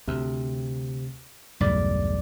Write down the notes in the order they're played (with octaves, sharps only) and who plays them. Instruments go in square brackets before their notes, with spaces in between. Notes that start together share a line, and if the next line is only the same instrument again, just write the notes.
[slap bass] D2 [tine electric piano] C3
[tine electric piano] B1 E2 D5 [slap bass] G2 C#3 A3